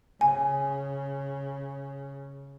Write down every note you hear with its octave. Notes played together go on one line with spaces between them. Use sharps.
C#3 G#5